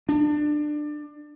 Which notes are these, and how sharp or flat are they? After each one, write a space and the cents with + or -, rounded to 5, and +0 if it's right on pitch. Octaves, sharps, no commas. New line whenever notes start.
D4 +20